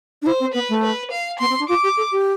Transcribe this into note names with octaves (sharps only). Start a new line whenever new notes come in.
D4
E4 C5
C4
B3 B4
A3
B4
F5
B3 C6
C4
D4
F4 D6
G4
A4
G4